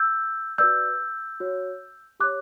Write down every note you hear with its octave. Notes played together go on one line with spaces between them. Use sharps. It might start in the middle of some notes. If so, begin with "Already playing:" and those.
Already playing: E6 G6
F#4 B4 D5 E6 G6
F#4 C#5
G4 C#5 D6 F#6